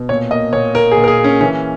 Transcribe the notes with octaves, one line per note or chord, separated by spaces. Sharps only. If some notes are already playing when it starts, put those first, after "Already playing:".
Already playing: B2
A#2 C#5
A#3 D#5
A#2 C#5
A#3 A#4
G#4
A#2
A#4
G#4
A#3
C#4
E3 C#4